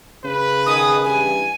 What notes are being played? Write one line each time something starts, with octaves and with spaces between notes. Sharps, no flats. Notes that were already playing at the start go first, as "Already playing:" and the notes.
C#3 B4
D#3 G#4 D#6
G2 E3 G#5